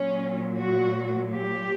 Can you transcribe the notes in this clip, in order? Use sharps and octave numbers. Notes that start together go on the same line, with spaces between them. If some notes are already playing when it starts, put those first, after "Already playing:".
Already playing: A#2 F#3 C#4
F#4
G4